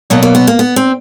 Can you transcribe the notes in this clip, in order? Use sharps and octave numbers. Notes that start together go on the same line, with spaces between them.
B2 F#3 A#3 B3
A#3
B3
A#3
B3
C4